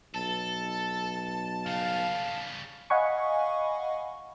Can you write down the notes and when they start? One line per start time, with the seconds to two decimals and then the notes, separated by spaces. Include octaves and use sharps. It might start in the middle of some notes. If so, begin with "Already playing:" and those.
0.14 B1 A4 A5
1.67 C#3 G3 F5
2.90 D#5 F5 F#5 G#5 B5 C#6